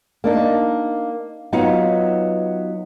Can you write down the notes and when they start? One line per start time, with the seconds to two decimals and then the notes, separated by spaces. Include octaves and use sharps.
0.24 A#3 D4 D#4
1.53 F#3 B3 D#4 F4